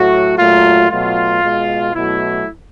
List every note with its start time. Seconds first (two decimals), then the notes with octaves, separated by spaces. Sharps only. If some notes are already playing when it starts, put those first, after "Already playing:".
Already playing: A2 F#3 A3 F#4
0.38 A#2 F#3 A3 F4
0.90 B2 F#3 A3 F4
1.43 B2 G#3
1.94 B2 F#3 A3 E4